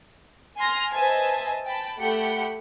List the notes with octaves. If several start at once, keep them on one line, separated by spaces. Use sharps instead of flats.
G#5 C6 F6 A#6
B4 C5 D#5 E5 G#5 A5
G5 A5 B5
A3 G4 F#5 B5 G6 C#7